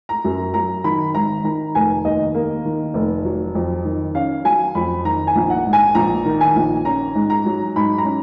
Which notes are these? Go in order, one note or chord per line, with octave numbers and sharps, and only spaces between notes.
A#5
F#2
F#3 A#5
D#3 B5
G#1 A#5
D#3 A#5
F1 G#5
D#2 D#5
A#3
D#3
F1
F#3
F2
D#3
C#4 F5
F#3 G#5
F2 B5
D#3 A#5
G#5
A#1
F#5
G#2
G#5
A#1 A#5
D#3
G#5
A#1
C#4 A#5
G#2
A#5
F#3
G#2 B5
A#5
C#4